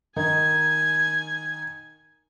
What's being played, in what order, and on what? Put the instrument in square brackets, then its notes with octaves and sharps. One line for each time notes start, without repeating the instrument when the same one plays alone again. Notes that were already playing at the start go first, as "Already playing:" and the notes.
[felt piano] D#3 D#4 [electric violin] G#5 G#6